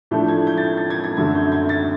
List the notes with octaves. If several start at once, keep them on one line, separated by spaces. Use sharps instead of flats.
A2 F3 A3 D4 G6
G#6
G6
A6
G#6
A6
G#6
G#6
F#2 D3 F#3 A3 G#6
G6
G#6
A6